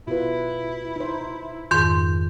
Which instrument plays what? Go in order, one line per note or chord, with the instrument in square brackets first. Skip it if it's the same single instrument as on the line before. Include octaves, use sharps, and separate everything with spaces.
[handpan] B2 F4 B4 [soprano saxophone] E4
[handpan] D#4 C5
[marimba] F2 G#2 [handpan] D#3 [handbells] C6 G6